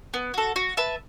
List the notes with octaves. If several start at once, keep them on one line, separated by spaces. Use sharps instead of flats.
B3
F#4 A4
F#4
B4 E5 A5